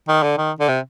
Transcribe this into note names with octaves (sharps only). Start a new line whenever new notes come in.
D#3
D3
D#3
D3
C3